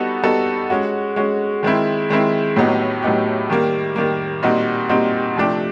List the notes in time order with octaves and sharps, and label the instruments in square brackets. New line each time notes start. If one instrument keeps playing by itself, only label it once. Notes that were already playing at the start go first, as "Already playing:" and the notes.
Already playing: [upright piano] G3 B3 D#4 F#4 A4
G3 B3 D#4 F#4 A4
G#3 C#4 F#4
G#3 C#4 F#4
D#3 G#3 C4 E4
D#3 G#3 C4 E4
A2 F#3 B3 D#4 G4
A2 F#3 B3 D#4 G4
D#3 G3 A#3
D#3 G3 A#3
A#2 G3 C4 D#4 F#4
A#2 G3 C4 D#4 F#4
C3 F3 A3 D4 G4